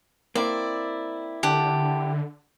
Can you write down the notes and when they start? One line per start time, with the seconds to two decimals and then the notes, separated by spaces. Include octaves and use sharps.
0.35 A#3 C4 E4 D5
1.43 D3 G4 F#5 A5